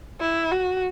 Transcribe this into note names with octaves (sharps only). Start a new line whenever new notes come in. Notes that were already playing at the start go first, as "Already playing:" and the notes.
E4
F#4